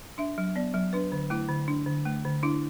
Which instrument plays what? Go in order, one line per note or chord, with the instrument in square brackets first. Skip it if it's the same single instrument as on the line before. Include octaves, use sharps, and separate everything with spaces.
[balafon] D4 E5
F#3
B3 D5
F#3
D4 B4
D3
A3 E4
D3
D4
D3
A3
D3
D4 E4